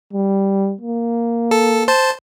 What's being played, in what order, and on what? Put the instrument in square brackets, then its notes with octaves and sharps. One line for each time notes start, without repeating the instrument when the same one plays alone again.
[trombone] G3
A#3
[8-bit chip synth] A4
C5 A5